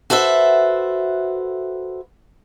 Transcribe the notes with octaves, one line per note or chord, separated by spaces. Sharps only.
F#4 A4 B4 C5 E5